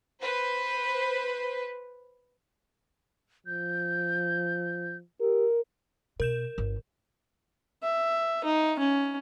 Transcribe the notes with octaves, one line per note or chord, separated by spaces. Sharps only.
B4 C5
F3 G6
G4 A#4
B2 A#4 G6 E7
G1
E5
D#4
C#4